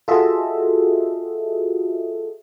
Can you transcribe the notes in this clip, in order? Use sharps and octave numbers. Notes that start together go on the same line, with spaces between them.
F4 F#4 G#4 A4 D#5 E5